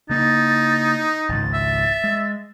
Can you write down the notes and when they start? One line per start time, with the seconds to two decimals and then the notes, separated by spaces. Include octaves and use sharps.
0.10 C#3 A#3 D#4 A6
1.29 G#1 C#2 A6
1.53 E5
2.04 G#3